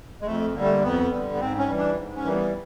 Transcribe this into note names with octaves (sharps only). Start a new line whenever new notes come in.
G#3
F2 A3
D3 G3 A3 A#3
A#3
F2 B3
D3 G3
B3
G#2 C4
C#4
E3 G3
D4
G#2
C#4
E3 G3 A#3
B3